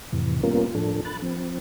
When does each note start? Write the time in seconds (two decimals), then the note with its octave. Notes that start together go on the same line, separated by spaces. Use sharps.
0.13 F2 A2 C3 E3
0.43 G3 A#3 B3 C#4 F4 A#4
0.75 A2 F3 D4 A4
1.05 B5 F#6 A6
1.22 F3 C4